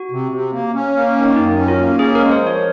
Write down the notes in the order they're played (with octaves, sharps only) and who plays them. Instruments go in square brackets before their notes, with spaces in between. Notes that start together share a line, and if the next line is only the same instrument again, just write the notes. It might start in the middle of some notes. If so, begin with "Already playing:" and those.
Already playing: [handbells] F#4
[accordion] C3
C3
A#3
C#4
A#3
D#3
[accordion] F#2 [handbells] D#4
[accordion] C#4
[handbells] F4
[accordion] A#3
[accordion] C#4 [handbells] G#4
[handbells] A#4
[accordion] G#3
[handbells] C5
[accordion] F3 [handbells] C#5